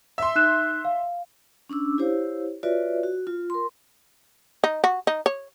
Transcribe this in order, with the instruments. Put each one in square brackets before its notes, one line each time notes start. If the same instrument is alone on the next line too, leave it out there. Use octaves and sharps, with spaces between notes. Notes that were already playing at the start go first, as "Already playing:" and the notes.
[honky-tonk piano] E5 C6
[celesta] D#4 F#6 E7
F5
[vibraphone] C#4 D4 D6 E6
E4 G4 C5 C#5 F5
F4 F#4 B4 C#5 D5 E5
F#4
F4
A#4 C6
[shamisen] D#4
F#4
D#4
C#5